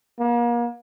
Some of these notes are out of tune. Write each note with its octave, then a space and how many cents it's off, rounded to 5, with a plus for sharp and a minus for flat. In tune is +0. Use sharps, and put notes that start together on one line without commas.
A#3 +35